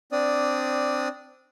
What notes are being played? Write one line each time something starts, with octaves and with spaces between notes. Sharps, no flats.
C4 D4 D5 D#6